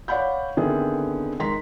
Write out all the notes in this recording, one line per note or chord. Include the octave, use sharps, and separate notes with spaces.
C#5 D5 F5 F#5 B5 G6
D3 D#3 B3 C4 E4 G#4
D#3 G#3 A#5 C6 B6